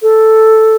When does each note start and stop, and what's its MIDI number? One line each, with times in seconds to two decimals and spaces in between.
0.02 0.76 69